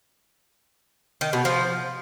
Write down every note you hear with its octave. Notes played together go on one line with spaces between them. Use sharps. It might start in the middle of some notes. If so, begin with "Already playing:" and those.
D#3
B2
F3